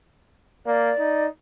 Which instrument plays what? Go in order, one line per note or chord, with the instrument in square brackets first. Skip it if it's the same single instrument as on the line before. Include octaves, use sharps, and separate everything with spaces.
[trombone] A#3 [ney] D5
[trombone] D#4